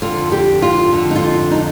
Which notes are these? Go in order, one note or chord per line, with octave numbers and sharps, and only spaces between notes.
F2 D3 F4
G4
F4
F2 D3
D#4
F4
D#4